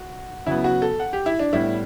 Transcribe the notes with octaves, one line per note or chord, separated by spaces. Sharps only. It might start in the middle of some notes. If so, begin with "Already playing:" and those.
Already playing: F#4
C#3 F#3 B3 E4
F#4
A4
F#5
G4
E4
D4
A2 G3 B3 E4